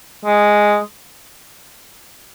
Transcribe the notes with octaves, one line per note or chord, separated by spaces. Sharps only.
G#3